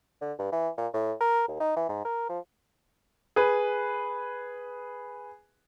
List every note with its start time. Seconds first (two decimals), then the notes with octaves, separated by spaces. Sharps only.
0.21 D3
0.39 G2
0.52 E3
0.78 A#2
0.94 A2
1.21 A#4
1.48 D#2
1.60 D#4
1.76 E3
1.89 G#2
2.05 A#4
2.29 F3
3.36 G#4 B4